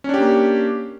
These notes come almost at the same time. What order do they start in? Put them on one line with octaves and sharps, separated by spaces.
C#4 D4 G4 A#3